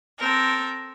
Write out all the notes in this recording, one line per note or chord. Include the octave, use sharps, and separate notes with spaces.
C4 A4 A#4